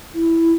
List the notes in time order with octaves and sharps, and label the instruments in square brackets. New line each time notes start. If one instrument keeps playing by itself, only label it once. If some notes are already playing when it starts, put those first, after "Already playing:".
[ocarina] E4